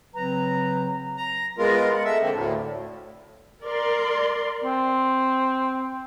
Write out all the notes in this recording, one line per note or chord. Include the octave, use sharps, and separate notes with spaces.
C#3 F#3 C4 B4 A#5
A#5
G#3 B3 F4 A#4
F#5
A3 E5
D3 A#3 C4
D2 A2
A#4 D5 C6
C4